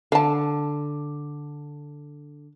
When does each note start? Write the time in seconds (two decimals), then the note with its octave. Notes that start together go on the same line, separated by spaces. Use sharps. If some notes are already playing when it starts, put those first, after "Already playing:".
0.12 D3 F5 A5